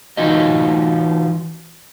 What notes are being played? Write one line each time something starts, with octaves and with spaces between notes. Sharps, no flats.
E3 D#4 F4 F#4 D#5